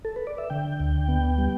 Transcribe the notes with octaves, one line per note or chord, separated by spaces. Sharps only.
A4
B4
D5
E5
D3 G5
D2
B3
G3